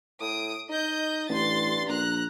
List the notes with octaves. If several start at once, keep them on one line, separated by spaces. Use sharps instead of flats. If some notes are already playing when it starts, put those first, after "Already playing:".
A2 D#6 D7
D#4 D#5 G6
A1 G2 C6 A6
A#1 A#5 F#6